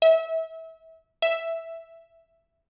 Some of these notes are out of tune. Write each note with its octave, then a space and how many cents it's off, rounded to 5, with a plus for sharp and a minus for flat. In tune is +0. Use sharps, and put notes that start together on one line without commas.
E5 -30
E5 +0